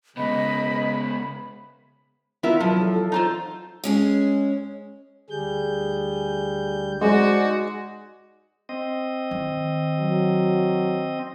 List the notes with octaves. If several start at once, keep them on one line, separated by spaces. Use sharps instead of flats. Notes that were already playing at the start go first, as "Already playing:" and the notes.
C#3 G#3 B3 D#5 B5
E3 B3 E4 F4 A#4 E5
F3 F#3
A4
A4
D#4 F4 C5
G#3 C#4 G#4
D2 G3 G#4 G6
G#3 D#4 F#4 C5 D5
C4 D#5
D#3
F#3